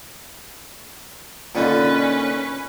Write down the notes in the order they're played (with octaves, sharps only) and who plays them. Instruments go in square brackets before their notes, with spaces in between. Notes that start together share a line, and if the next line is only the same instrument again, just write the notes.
[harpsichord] A#2 D3 D#4 [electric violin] C#4 B4